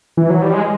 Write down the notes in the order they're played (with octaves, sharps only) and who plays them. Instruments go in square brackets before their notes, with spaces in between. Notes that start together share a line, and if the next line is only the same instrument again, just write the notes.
[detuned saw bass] E3
F#3
G3
G#3